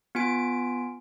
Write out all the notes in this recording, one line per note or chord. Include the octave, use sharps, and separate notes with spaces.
B3 F4 G#5 D7